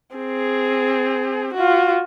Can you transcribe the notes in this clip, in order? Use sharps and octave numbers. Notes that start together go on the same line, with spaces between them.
C4 G#4
F4 F#4